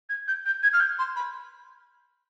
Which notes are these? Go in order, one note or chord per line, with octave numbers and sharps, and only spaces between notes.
G#6
G6
G6
G#6
F6
G6
C6
B5